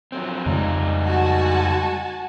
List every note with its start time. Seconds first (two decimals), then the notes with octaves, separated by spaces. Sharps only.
0.12 F3 F#3 C4
0.46 F2 C#3 G3 G#3 D#4
1.05 F#4 G#5 A5